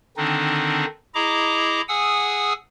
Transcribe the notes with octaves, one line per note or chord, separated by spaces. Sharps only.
D3 D#3 C4 D4 D#4
E4 G#4 D#5 A#5 D6
G#4 F#5 G#5 D#6 E6